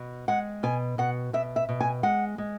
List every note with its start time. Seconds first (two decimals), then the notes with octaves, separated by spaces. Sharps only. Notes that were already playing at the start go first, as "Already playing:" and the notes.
Already playing: B2
0.28 G#3 F#5
0.63 B2 G#5
0.98 B2 F#5
1.33 B2 E5
1.56 E5
1.69 B2
1.80 G#5
2.03 G#3 F#5
2.38 G#3